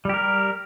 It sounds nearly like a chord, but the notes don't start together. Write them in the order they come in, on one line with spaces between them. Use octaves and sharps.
G3 G4 A#4